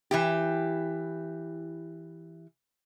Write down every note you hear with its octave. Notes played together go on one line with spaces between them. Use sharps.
E3 E4 G4